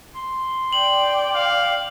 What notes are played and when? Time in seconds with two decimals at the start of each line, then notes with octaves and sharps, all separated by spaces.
0.15 C6
0.73 D5 G5 F#7
1.34 F5